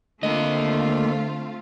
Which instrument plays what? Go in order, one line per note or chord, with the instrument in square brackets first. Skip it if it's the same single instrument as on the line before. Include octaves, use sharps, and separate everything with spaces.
[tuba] D3 [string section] A3 C4 F4 [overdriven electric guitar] A#3 D#5